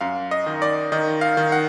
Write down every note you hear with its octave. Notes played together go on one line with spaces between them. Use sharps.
F#2 F5
D#5
D#3
D5
D#3 D#5
F5
D#3
F#5